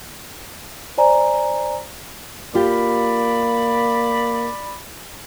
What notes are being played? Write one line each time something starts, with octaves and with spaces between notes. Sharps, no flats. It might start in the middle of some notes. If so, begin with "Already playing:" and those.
C5 D5 G#5 A#5
A#3 F4 G4 D5 B5